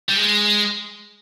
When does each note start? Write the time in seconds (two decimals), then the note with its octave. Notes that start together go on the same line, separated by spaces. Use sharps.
0.09 G3
0.16 G#3